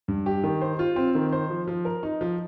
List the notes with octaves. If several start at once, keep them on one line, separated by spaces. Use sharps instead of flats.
G2
G4
D#3
C5
F4
C4
D#3
C5
F3
F3
A#4
D#4
F3